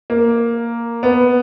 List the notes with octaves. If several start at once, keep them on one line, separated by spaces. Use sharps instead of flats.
A#3
B3